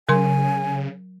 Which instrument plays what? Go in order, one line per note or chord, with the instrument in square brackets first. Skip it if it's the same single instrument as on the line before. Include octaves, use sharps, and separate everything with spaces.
[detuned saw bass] C#3 [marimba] F#3 A#4 C6 [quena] G#5